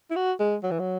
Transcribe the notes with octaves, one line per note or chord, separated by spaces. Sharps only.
E4
F#4
G#3
F#3
E3
F#3